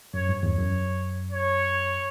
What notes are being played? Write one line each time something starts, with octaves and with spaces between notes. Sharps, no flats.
F#2 C#5
G2
E2 C#5
F#2
C#5